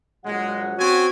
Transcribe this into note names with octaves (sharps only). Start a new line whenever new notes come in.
A#1 F#3 G#3 F#5
C4 C#4 F#4 G#5